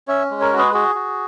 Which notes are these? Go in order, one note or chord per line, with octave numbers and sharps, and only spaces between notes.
C#4 C#5 E5
G#3
A#4 C#5
F#4
G#4 B4
F#4 G#4
F#4